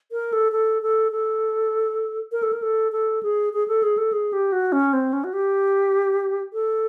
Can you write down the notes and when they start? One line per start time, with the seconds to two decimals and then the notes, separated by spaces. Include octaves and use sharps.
0.12 A#4
0.33 A4
0.52 A4
0.82 A4
1.12 A4
2.32 A#4
2.43 A4
2.53 A#4
2.62 A4
2.92 A4
3.23 G#4
3.53 G#4
3.68 A4
3.83 G#4
3.98 A4
4.13 G#4
4.33 G4
4.52 F#4
4.72 C#4
4.93 C4
5.13 C#4
5.24 F#4
5.33 G4
6.53 A4